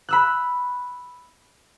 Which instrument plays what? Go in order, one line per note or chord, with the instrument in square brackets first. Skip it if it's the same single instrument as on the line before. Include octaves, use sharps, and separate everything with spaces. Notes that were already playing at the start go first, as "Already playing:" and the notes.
[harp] B5 E6 F#6